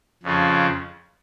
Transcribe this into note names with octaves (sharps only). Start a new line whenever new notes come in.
F2 C#3 F3